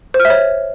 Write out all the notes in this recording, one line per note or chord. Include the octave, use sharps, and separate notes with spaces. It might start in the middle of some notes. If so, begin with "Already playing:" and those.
C5
F6
E5
C#5